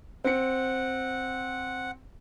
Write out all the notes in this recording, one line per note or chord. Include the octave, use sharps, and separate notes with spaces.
C4 F#5 C#7